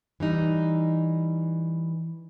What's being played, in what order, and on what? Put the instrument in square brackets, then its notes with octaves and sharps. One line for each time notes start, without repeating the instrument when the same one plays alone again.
[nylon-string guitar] E3 G3 D#4